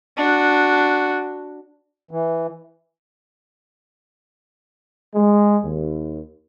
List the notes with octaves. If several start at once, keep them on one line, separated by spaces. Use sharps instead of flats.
D4 F#4
E3
G#3
D#2